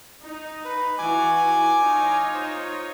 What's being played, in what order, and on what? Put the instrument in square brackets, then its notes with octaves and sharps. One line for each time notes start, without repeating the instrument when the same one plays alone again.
[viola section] D#4
[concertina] B4
[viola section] E3 F#4 [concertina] G#5 D6
[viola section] D#4 F4 C#5
[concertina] C5